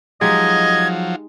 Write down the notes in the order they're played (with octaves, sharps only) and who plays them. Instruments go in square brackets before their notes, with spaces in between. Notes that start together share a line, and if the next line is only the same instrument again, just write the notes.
[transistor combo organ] F3 F#3 [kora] G#3 D#4 G4 [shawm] D#5 [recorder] G#6